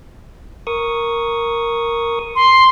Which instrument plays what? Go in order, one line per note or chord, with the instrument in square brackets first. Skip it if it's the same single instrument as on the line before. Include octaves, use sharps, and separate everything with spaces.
[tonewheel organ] A#4 C#6 D#6
[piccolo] C6